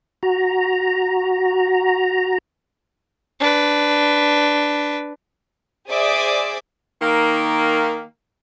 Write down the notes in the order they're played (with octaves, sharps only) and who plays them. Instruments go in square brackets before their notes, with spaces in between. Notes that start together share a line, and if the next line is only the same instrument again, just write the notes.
[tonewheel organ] F#4 A#5
[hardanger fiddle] D4 B4
[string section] G#4 C5 D5 E5 D6 D#6
[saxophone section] D#3 A#3